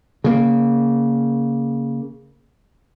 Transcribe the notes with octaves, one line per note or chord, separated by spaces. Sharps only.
C#3 A#3